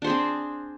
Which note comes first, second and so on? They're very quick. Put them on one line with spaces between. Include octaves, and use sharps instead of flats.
D4 C5 G#4 C4